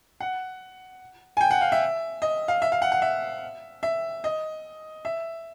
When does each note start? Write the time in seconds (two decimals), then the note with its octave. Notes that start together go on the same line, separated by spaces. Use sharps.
0.20 F#5
1.37 G#5
1.41 G5
1.51 F#5
1.61 F5
1.72 E5
2.22 D#5
2.48 F5
2.62 E5
2.72 F5
2.82 F#5
2.92 F#5
3.02 E5
3.83 E5
4.24 D#5
5.05 E5